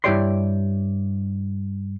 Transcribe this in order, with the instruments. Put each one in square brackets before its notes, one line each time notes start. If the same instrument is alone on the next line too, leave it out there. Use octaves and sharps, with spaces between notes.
[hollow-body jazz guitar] G2 E4 G4 C#5 D5 C6